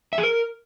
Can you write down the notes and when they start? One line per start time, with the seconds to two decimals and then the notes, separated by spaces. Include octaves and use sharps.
0.13 E5
0.18 G#4
0.23 A#4